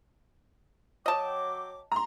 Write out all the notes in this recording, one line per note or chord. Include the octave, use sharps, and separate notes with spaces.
F#3 D#5 G5 A5 D6
A#5 C6